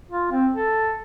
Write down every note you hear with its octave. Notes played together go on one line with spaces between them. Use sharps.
F4
C4
A4